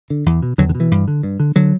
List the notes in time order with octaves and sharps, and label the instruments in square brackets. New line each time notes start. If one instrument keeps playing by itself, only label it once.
[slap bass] D3
E2
B2
E2 D3 F#3
D3
B2
E3
G2
D3
G2
D3
D3 F#3